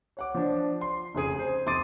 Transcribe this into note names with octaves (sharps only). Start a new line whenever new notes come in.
C#5 F#5 D6
F3 D4
C6
F1 C#3 G#4 D#7
C5
F1 C6 D6 D#6 A6 D#7